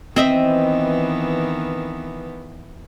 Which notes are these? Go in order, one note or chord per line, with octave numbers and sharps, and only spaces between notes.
D#3 E3 B3 C4 D#5 E5